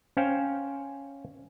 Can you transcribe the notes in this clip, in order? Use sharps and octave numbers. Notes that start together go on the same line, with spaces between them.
C#4 C5 F5 G5